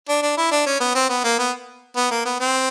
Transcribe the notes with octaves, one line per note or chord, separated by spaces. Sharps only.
D4
D4
E4
D4
C#4
B3
C4
B3
A#3
B3
B3
A#3
B3
C4